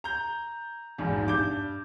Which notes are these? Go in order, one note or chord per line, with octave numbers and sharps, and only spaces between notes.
A#5 G6
A#1 E2 G#2 B2
G2 D6 G6